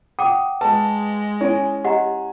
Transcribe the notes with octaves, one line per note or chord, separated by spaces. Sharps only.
F#5 G5 D6 D#6
G#3 B4 A5
C#4 E4 G#5
G4 D#5 F#5 A#5